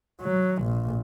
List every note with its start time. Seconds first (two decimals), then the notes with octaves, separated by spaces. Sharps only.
0.21 F#3
0.63 A#1